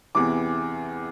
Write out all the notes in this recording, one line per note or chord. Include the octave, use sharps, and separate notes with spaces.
E2 C3 E3 D6